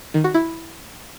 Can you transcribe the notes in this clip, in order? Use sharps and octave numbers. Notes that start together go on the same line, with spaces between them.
D#3
F#4
E4